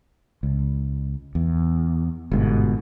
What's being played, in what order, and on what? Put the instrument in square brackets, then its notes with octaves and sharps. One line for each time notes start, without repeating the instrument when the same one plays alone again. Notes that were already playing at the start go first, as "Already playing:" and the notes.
[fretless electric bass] C#2
E2
G1 G#2 B2